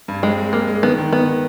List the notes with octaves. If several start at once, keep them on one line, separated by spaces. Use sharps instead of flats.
G2
G#3 C4
G#3
G#3 A#3
G#3
D#3 B3
D#3
D#3 B3
D#3